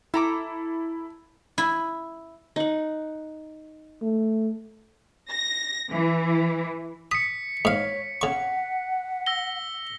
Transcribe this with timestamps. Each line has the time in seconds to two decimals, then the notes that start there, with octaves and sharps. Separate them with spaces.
0.14 E4 A4 A#5 D6
1.58 E4
2.56 D#4 F#5
4.02 A3
5.30 A#6
5.90 E3
7.12 D#6 B6 C#7
7.65 G#2 C#5 F5
8.21 C#3 F#5 C#6
9.26 E6 A#6 G7